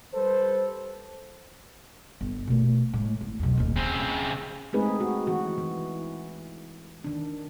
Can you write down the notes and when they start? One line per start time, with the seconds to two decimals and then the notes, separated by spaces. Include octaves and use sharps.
0.14 G3 A4 B4 C5
2.21 G1
2.48 B2 A3
2.93 A2 G#3
3.21 G#1
3.39 B1 F2
3.57 D1 D#2
3.77 C#3 C4
4.73 G#3 A3 C4 D#4 G#4 B4
5.00 F#4
5.27 E3 F#4
5.58 E3
7.04 D#3 D4